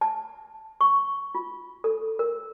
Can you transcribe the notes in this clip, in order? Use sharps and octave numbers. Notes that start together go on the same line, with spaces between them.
A5
C#6
F4
A4
A#4